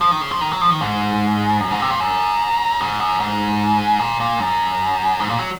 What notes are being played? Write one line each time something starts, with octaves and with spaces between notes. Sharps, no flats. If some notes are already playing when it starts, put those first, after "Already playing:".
F3
D#3
C#3
F3
D#3
F#3
F3
D#3
G#2
F#2
G#2
C3
A#2
F#2
G#2
F#2
G#2
A#2
A#2
F#2
G#2
A#2
F#3